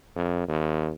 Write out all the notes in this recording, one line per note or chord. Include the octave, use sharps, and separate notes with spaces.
F2
D#2